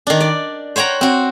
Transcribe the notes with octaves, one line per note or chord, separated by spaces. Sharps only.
D#3 D4
D5
C5 C#5 F#5 G5 A#5
C4 F#4